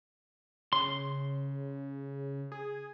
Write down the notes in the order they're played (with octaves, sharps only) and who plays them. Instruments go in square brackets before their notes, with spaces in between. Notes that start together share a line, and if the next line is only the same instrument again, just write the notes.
[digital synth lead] C#3 [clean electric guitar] C6
[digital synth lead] G#4